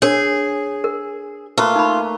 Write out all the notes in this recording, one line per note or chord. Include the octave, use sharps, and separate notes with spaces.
D4 G#4 A#4 C#5
A#4
A3 A#3 F4 B4
D#4 B5